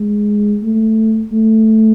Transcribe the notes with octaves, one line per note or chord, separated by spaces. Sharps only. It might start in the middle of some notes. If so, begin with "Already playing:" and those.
Already playing: G#3
A3
A3